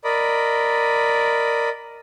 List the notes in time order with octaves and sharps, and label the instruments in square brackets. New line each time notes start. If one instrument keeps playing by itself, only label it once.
[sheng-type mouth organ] A#4 D5 D#5 B5